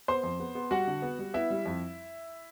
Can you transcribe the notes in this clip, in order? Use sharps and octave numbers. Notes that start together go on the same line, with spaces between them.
B3 C5 C6
F2
B3
B3
G3 F#4 F#5
D3
B3
G3
B3 E4 E5
G3
F2